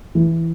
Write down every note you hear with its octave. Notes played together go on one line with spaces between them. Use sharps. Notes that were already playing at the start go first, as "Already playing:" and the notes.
E3